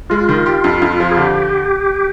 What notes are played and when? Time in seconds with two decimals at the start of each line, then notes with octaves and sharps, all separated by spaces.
0.10 G#3 F4
0.29 D#3
0.46 G4
0.64 F2
0.82 F2
1.00 F3
1.11 G#4
1.17 D3 G4